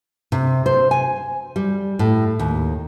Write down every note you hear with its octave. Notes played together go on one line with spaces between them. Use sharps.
C3
C5
G#5
G3
A2
D#2